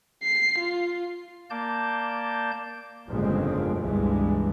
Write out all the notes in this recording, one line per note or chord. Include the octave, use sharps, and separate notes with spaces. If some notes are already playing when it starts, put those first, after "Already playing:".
C7
F4
A#3 D5 A5 G6
G1 F2 A#2 C#3 G#3 C4
G1 C#2 G2 B2 E3 G#3